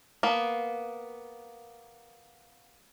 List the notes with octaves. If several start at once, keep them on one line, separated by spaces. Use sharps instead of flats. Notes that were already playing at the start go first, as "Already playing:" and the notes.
A#3 B3